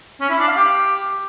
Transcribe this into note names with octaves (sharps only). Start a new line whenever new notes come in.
C#4
E4
D4
F5
G4